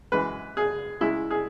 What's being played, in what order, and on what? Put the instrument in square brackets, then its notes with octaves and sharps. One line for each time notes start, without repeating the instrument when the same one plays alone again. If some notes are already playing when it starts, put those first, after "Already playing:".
[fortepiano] F#2 E3 G#3 B4
G#4
C#2 C#3 G#3 E4
G#4